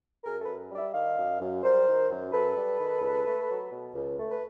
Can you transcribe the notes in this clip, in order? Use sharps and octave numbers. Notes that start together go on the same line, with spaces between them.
F#2 G#4 A#4
A4 B4
F#2
G3
D5 E5
D#3 D#5 F5
F#2
F#2
G3 A#4 C5
D#3
F#2
F#2 A4 B4
G3
D#3
C#2
A3
F#3
B2
C#2
A3
B4